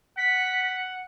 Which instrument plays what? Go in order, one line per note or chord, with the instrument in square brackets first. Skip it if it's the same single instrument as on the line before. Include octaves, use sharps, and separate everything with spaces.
[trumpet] F#5 [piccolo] B6